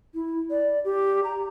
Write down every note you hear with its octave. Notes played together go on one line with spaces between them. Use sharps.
E4
D5
G4
A#5